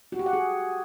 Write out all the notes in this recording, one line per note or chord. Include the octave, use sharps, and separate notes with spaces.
F#4
G4
F#5
G#4